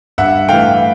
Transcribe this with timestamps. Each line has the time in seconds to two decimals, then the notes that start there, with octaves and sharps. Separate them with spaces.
0.18 G2 E5 F#5
0.48 E3 A3 F5 G5